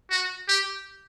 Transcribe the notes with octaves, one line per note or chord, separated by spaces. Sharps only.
F#4
G4